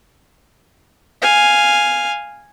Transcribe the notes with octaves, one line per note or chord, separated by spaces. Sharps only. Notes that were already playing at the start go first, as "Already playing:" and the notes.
F5 G#5